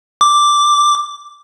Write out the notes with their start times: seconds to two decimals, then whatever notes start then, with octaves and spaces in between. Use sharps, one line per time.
0.21 D6